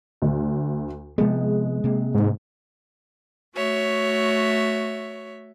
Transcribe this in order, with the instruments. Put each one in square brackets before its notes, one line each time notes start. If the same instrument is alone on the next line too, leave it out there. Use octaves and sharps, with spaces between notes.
[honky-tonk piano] D2
[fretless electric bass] C3 F3 B3 [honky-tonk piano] G#3
[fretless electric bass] C3 A#3 C4
[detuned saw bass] G#2
[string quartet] A3 F#4 C#5 E5